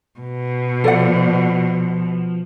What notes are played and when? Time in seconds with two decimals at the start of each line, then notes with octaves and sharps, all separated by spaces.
0.20 B2
0.84 F3 A4 D5 F#5